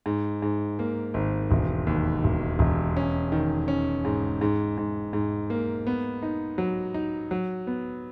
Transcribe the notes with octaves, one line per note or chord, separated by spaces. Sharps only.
G#2
G#2
A#3
G#1
E1
D#2
E1
E1
C#4
D#3
C#4
G#2
G#2
G#2
G#2
A#3
B3
D#4
F#3
D#4
F#3
B3